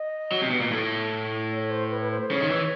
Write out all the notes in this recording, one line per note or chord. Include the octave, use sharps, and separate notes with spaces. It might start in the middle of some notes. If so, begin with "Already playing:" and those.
Already playing: D#5
F#3
C3
B2
A#2
A2
C#5
C#5
C5
B4
B4
C5
C5
C#3 C#5
D#3
E3